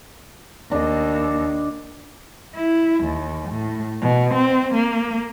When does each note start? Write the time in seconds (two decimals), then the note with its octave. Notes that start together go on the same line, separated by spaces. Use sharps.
0.71 D#2 D4 D#5
2.55 E4
3.03 D#2
3.50 A2
4.01 B2
4.34 C4
4.74 A#3